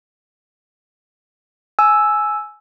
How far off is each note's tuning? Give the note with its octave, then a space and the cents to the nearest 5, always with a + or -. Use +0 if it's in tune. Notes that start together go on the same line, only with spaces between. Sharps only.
G#5 +15 E6 +0